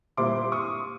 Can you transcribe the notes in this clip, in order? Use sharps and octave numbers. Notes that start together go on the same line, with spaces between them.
A#2 G3 C4 E4 C6 D6
C#6 D#6